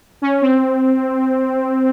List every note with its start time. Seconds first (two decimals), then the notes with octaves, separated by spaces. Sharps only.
0.22 C#4
0.42 C4